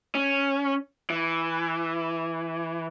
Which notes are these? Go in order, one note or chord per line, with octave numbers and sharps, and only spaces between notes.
C#4
E3